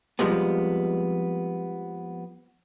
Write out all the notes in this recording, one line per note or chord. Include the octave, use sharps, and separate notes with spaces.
F2 F3 G3 G#3 B3